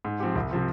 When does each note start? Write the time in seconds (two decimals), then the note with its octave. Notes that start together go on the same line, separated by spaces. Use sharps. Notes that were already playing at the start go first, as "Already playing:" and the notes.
0.05 G#2
0.20 F3 C4 G4
0.36 C2
0.51 C3 F3 C4